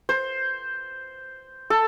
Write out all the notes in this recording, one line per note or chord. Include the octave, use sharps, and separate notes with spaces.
C5
A4